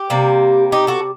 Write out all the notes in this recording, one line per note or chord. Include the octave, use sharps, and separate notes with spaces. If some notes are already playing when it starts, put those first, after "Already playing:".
Already playing: G4
C3 G3 A#3
D#4 G4
F#4 A4